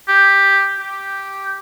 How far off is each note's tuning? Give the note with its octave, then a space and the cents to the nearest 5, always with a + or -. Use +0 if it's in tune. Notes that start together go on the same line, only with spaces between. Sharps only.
G4 +5
G4 -5